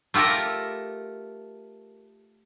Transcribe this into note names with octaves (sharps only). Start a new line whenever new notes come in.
A3 F4 G4 A4 A#4